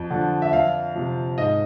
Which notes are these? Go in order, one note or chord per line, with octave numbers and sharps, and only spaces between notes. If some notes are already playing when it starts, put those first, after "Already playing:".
Already playing: F2
D3 F3
E5
F2 F5
C3 F3
G#2 D#5